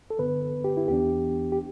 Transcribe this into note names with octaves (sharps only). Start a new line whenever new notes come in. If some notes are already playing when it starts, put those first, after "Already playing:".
A4
G2 D3 B3 B4
G4
E4
E2 E3 B3 D4 G4
G4